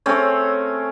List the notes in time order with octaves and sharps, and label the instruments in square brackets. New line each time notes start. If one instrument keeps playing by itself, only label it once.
[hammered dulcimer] A3 C4 C#4